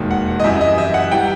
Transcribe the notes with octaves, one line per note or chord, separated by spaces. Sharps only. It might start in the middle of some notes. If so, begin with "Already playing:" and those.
Already playing: E1 D#2 D#3
F#5
D#5
F#2 E3 G3 E5
D#5
E5
F#5
E3 G3 G5